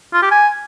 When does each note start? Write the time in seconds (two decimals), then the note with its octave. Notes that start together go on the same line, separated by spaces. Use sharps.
0.14 F4
0.23 G4
0.31 G#5